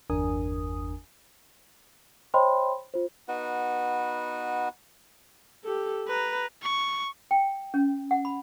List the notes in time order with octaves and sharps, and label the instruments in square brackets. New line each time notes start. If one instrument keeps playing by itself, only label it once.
[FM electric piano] G1 E2 D4 A#4 G#5 D#6
[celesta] C5 C#5 D#5 G5 B5 C6
F4 C5
[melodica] B3 D#4 F#4 B4
[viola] G4 A4
B4 A#5
[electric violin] C#6
[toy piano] G5
C#4
F#5
B5